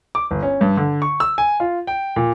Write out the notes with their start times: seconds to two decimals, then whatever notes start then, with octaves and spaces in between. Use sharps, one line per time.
0.15 D6
0.31 G1
0.43 C#4
0.61 G2
0.77 D3
1.02 C#6
1.20 E6
1.38 G#5
1.60 F4
1.87 G5
2.16 A#2